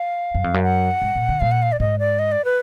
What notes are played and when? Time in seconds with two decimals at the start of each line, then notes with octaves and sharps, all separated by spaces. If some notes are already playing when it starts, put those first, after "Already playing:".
Already playing: F5
0.35 F#2
0.44 F2
0.54 F#2
0.63 F#5
1.02 G#2
1.15 A#2
1.29 D3
1.40 A#2 F5
1.51 F#5
1.62 F5
1.72 D5
1.80 G#2 D#5
1.99 D5
2.19 D#5
2.32 D5
2.45 B4